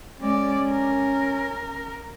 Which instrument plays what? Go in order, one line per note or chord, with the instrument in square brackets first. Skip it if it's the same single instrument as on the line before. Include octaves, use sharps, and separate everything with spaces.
[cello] G#3 D5 [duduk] C#4
[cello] A#4